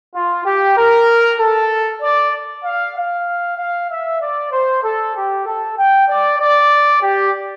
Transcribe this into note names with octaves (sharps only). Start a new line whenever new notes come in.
F4
G4
A#4
A4
D5
F5
F5
F5
E5
D5
C5
A4
G4
A4
G5
D5
D5
G4